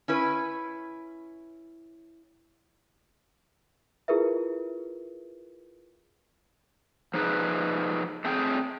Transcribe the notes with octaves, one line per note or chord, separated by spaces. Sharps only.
C#4 E4 B4
E4 F4 G#4 A#4 B4 E5
F3 D#4 G#4 B4
A3 C4 G#4 G5